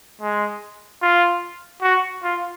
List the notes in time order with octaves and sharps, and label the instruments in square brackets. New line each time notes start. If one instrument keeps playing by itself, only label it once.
[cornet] G#3
F4
F#4
F4